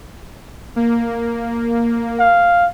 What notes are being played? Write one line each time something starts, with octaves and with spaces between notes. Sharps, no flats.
A#3
F5